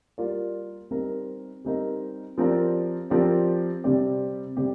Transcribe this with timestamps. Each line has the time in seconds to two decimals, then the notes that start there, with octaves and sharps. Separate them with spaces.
0.18 G3 A#3 F4 A#4 D5
0.91 G3 C4 D#4 A#4
1.65 G3 C4 D#4 A#4
2.38 F3 C4 G4 A#4 D5
3.10 F3 C4 G4 A#4 D5
3.84 C3 G3 C4 G4 D5
4.57 C3 G3 C4 G4 D5